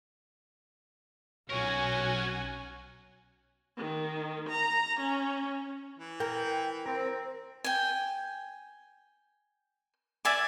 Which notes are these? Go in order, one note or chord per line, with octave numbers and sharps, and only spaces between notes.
B1 C#4 F#4 A#4 C#5 F#5 G#5
D#3
A#5
C#4
E3
A#4 G5
C4 A#4
G5 G#5
D5 E5 G#5 D6